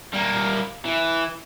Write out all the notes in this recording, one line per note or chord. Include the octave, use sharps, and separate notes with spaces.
G3 A#3
E3